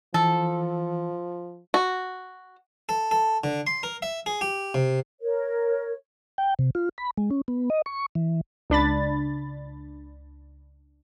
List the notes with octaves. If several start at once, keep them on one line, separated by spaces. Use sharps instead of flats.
E3 F3 A4
F#4
A4
A4
D3
C6
A#4
E5
G#4
G4
C3
A#4 C#5
G5
C3
F4
B5
G#3
C#4
B3
D#5
C#6
E3
C#2 D4 B5 A6